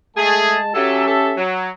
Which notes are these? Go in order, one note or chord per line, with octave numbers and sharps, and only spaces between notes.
G#3 A3 G#4 A5
F#3 C#4 G4 A4 E5
A4
F#3